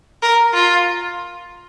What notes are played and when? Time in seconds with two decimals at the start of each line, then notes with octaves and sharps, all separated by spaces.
0.22 A#4
0.54 F4